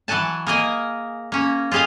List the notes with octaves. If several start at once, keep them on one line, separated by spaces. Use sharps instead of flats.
E3 F#3 F#5 G#5 A5
A#3 G#4 A#4 D#5 G#5
A#3 C#4
F4 G4 G#4 D#5 F5